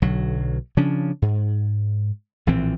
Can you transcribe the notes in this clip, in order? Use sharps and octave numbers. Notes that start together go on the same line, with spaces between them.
B1 D3 F#3
C#3 F3 C#4 D4
G#2
A#1 A2 E3 C4